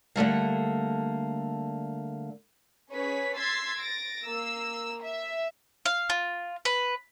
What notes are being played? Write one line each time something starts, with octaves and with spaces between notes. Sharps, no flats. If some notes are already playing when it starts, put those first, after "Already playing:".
D3 G3 A3 A#3
C#4 G#4 B4 C#5 B6
C6 E6 G#6 A6 B6 C7
A6 A#6 D7
A#3 E6
E5
F5
F4
B4